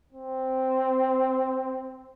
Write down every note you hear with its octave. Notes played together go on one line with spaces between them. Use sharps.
C4